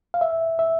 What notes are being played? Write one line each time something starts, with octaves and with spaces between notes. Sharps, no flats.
F5
E5
E5